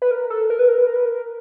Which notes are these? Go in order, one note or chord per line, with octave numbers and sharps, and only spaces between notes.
B4
A#4
A4
A#4
B4
A#4
B4
A#4
B4
A#4